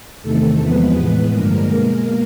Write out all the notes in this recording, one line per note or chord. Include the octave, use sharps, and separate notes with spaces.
E2 C3 D#3 A3 A4
E2 C3 F3 G#3 B3 B4
A2 E3 G#3
G2 D3 F3 G#3 A#3 A#4
B2 G#3